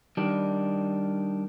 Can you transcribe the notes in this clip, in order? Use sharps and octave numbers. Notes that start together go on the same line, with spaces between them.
D#3 G3 D4